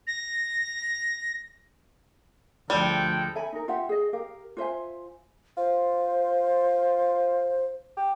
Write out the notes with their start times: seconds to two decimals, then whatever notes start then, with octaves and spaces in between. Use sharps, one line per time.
0.07 A#6
2.70 D2 F3 G3 G#3 A4 G5
3.35 A4 E5 G#5 B5
3.52 D#4 A#4
3.68 F4 G4 E5 F#5
3.89 G#4 D#5
4.13 G4 A#4 F5
4.57 F4 C5 E5 G#5
5.57 F4 C5
7.97 G4